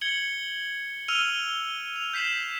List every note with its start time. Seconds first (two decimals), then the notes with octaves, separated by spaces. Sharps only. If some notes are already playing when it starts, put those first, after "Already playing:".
0.01 G#6 C#7 F#7 G7
1.08 E6 F6 D#7 F7 G7
1.96 F7
2.13 G6 B6 C7 E7 F#7